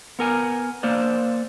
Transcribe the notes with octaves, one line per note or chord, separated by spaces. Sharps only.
B3 A#4 G#5
A#3 C5 D5